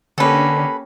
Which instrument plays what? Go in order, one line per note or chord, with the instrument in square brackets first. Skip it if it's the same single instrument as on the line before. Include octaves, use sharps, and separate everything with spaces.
[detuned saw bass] D3 [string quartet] A#3 C#4 G4 [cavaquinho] A4 B4